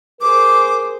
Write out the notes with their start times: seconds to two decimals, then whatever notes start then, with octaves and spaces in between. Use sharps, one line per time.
0.21 G#4 A#4 C5 D6